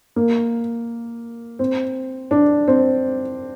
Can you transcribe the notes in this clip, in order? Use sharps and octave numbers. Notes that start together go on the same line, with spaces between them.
A#3
C4
D4
C4